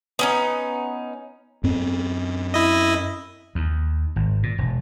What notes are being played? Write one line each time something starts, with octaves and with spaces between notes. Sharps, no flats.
B3 C#4 D#4
F#2 C4
E4 D#5
D#2
G#1
A#2
E1